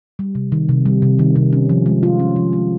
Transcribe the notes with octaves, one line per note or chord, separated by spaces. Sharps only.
G3
C3
D#3
C3
G3
C3
D#3
C3
C#4
F3
G#3
F4
C#4
F3
G#3